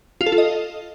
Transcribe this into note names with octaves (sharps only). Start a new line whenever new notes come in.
F4
A4
F4
D#5